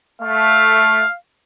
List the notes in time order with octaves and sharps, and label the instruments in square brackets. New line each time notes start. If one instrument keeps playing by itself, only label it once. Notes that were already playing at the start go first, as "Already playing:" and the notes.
[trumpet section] A3 [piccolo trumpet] F5